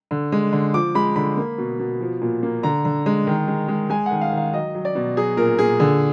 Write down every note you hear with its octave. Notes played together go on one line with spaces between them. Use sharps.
D3
G#3
D3
F3 D6
G#3 B5
D3 B5
A#3
B2
B2
F3
A#2
A#3
D3 A#5
D3
G#3
D#3
G#3
G#3
G#3 G#5
F#5
D#3
F5
D#3
F5
F#3 D#5
F#3
D5
B2
F#3 G#4
A#2 A#4
A#2 G#4
D3 G#4